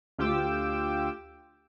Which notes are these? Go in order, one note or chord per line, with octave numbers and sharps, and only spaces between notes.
D2 F4 G4 G5 D6 E6